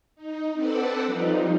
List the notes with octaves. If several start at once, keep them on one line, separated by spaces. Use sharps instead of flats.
D#4
C4 D4 A4 B4 D5 F#5
F3 G3 D#4 F4